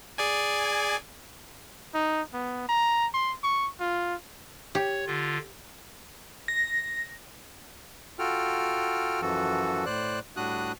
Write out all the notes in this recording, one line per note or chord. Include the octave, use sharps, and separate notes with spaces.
G#4 D5 G#5
D#4
B3
A#5
C6
C#6
F4
G4 C#5
D3 F4
A#6
F4 F#4 A4 G5 F6
F#2 E3 F3 F#4 A4
A2 C5 D5 F#6
A2 G3 D4 F#4 D#6 F#6